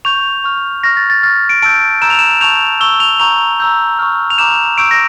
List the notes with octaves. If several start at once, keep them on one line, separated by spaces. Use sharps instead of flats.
C#6 G6 F7
C#6 F6
C#6 F6 A#6
A6
A6
C#6 F6 A6
D7
A5 E6 G6 D7
A#5 E6 G6 E7
F7
E7
A5 C#6 G6 F7
A5 C#6 E6 G7
F7
A#5 C#6 G6 F7
A#5 E6 G6
C#6 F6
F7
A#5 D6 G6 E7
C#6 E6 G6 D7
A#6